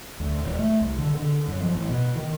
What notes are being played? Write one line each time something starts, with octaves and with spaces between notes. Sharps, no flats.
D2
D#1
A3
C2
D3
D3
F#2
F3
A1
B2
D#3